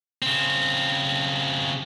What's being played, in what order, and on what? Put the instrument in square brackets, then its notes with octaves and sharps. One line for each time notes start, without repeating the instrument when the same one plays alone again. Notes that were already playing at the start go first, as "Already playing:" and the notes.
[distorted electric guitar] C#3 C4